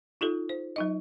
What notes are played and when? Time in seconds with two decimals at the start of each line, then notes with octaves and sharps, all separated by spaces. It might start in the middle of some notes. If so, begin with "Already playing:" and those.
0.21 D#4 F4 G4 A4
0.49 C5
0.76 F#3 D#4 D#5